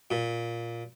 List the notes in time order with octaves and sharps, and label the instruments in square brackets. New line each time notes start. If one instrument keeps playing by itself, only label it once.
[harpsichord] A#2